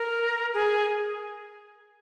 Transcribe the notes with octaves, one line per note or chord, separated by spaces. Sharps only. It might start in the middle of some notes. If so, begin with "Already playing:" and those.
Already playing: A#4
G#4